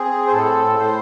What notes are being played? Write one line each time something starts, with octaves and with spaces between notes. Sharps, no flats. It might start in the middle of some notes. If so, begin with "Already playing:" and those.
Already playing: C4 G#4
C5
A2 A4
A2 C5